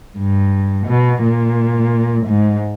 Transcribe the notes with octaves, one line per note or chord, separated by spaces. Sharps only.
G2
B2
A#2
G#2